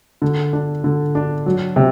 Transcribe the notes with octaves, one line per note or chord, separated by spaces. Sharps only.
D3
D4
D3
D4
F#3
C3